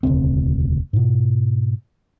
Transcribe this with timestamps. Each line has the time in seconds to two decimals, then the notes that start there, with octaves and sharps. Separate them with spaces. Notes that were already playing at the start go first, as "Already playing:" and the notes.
0.03 E1 D2 C#3 C4
0.93 G#2 B2